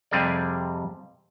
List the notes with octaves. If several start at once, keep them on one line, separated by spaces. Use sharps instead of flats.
F2 C3 G3 G#4 D5